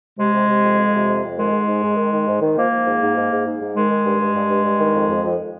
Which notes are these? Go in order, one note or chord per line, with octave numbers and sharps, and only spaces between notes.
C3 G#3
C3
C3
F2
F2
C3
F2
F2
D#3 G#3
G#2
G#2
G#2
D#3
D#3
G#2
D#3
F3 A#3
F3
G#2
G#2
G#2
G#2
G#2
G#2
D#3 G#3
D#3
G2
G2
G2
G2
G2
D#3
F2
F2
F2